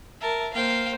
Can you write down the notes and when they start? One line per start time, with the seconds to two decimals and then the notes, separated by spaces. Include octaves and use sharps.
0.21 A#4 E5 A5
0.54 A#3 C5 F5 G5